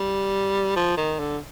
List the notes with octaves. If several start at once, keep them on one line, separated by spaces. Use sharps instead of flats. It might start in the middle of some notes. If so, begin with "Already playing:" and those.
Already playing: G3
F3
D#3
D3